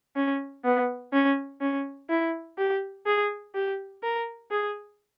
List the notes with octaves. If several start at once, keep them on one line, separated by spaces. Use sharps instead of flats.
C#4
B3
C#4
C#4
E4
G4
G#4
G4
A#4
G#4